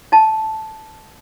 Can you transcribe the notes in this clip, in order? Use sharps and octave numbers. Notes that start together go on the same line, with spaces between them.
D#4 A5